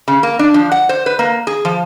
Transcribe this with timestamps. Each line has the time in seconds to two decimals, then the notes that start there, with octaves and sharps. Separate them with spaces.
0.08 C#3
0.23 A#3
0.39 D4
0.54 F3
0.72 F#5
0.89 C5
1.06 B4
1.19 A#3
1.47 G#4
1.65 F3